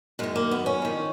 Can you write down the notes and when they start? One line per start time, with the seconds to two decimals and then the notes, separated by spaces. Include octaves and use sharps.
0.19 F#2 D#3 G#3
0.36 A#3
0.51 B3
0.66 C#4
0.82 F2 D#3